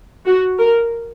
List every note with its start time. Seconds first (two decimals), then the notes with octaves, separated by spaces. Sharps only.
0.26 F#4
0.58 A#4